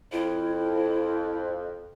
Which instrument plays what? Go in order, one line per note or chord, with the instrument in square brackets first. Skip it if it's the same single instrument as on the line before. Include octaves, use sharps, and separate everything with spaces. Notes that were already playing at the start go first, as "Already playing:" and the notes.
[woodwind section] F2 [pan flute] E4